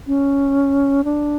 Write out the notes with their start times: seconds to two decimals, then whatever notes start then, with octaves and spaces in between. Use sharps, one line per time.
0.07 C#4
1.04 D4